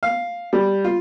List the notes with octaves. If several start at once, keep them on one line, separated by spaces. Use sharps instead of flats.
F5
G3
F4